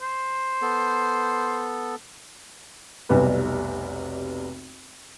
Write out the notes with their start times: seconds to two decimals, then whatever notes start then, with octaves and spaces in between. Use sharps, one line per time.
0.01 C5
0.62 B3 A4
3.09 F1 B1 C3 G3 B3 B4